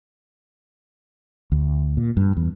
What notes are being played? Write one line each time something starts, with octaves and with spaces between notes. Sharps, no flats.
D2
A#2
G2
E2